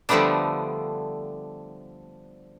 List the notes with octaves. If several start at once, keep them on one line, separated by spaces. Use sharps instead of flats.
D3 F3 G3 A3 B3 D4